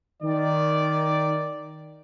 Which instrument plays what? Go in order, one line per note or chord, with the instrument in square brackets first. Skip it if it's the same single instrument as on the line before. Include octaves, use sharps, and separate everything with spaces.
[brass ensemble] D#3 D5